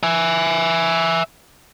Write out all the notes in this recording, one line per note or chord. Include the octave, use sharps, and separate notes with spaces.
E5 G#5